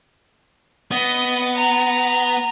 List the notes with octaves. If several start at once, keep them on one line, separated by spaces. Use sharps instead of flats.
B3 D#5
A#5